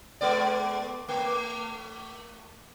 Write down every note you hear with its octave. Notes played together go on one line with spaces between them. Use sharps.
G#3 B3 D5
A3